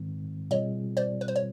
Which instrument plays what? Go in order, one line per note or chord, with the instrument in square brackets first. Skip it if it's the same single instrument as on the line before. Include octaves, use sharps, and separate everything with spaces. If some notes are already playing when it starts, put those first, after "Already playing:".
Already playing: [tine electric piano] G#2 D#3 G#3 C4
[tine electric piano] B2 G3 C4 F4 G#4 [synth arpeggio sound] C#5 D#5
[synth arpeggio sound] C5 D5
B4
C5
C#5